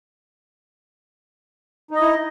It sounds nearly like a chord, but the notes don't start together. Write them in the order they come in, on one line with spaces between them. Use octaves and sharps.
D#4 D#5 E4